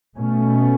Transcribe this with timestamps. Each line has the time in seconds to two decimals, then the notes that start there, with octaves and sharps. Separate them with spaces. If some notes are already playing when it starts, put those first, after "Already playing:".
0.18 B2 A3 C#4